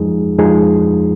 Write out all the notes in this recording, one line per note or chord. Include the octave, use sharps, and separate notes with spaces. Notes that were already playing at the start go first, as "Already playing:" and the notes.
Already playing: F2 F3 G#3 D#4 G#4
F2 F3 G#3 D#4 G#4